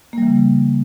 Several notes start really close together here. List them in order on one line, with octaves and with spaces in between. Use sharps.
A#3 G3 E3 C#3